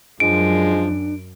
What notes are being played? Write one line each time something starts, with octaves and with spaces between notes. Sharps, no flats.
F#2 F3 G#3 D4 D7